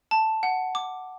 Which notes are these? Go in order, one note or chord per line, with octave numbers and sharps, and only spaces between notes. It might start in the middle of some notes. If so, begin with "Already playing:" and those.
A5
F#5
D6